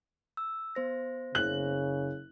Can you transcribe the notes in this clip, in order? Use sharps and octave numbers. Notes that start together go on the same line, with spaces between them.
E6
B3 C5 A#6
F#1 C#3 F#6 F#7